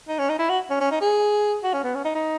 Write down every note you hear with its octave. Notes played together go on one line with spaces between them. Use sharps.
D#4
C#4
D#4
E4
F#4
C#4
C#4
D#4
G#4
F#4
C#4
B3
C#4
D#4
D#4